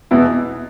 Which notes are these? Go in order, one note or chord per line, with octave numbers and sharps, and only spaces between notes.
E2 B2 B3 E4